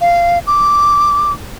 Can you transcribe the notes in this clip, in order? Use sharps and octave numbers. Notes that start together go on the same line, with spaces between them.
F5
D6